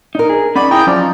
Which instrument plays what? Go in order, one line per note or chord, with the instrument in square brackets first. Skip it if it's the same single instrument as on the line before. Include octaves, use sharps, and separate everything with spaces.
[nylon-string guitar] D4 A#4 [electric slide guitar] D#4
[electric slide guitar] G#4
[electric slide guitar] C#4 D#4 F#5 [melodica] D5 [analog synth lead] B5
[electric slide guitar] E4 [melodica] G#4 A#5 [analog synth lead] G5 [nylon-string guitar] G#5
[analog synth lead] F3 [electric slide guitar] F#3 C#4 [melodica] D5
[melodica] D#4